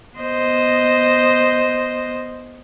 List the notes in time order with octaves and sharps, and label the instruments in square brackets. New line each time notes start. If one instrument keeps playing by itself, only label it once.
[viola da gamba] B3 C5 D#5